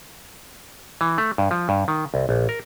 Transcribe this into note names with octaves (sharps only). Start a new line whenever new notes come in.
E3
A3
G2
F3
G2
D#3
C2
A#1
A#4